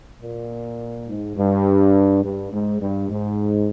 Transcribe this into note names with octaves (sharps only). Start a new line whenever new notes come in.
A#2
G#2
G2
G2
G#2
G2
G#2